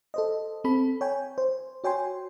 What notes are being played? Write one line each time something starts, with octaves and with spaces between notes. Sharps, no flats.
A4 C5 D#5
C4 A4 B5
C#5 G5 G#5
C5
F#4 C#5 G5 G#5 C6